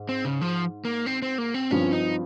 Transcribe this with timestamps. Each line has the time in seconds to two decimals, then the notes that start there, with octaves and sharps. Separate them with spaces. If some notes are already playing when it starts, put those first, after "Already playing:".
Already playing: G#2
0.09 C4
0.25 C#3
0.41 F3
0.85 A#3
1.06 C4
1.22 C4
1.38 A#3
1.54 C4
1.71 G2 F3 C4 C#4
1.92 D#4